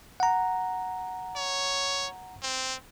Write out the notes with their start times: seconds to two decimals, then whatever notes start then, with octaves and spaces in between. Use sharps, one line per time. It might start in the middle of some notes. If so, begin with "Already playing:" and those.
0.20 F#5 A#5
1.36 C#5
2.42 C4